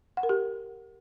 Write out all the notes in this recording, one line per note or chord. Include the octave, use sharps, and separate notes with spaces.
F#5
A#4
G4